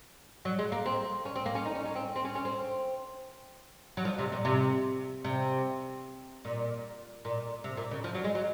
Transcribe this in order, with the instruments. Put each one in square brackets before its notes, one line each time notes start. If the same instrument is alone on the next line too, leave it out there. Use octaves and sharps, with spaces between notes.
[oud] F#3
G#3
A#3
C4
C#4
C4
A#3
C#4
D#4
C#4
C#4
C4
C4
C#4
C#4
C4
F#3
F3
C3
A#2
C3
C3
A#2
A#2
C3
A#2
C#3
F3
F#3
G#3
F#3